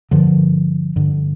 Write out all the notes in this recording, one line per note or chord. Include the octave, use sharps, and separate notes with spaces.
G2 D3 F3
G2 D3